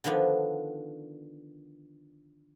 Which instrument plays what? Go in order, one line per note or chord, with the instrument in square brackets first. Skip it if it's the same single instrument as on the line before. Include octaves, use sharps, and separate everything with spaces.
[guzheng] D3 D#3 F3 B3 D4